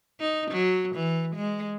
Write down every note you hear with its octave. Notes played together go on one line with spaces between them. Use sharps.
D#4
F#3
E3
G#3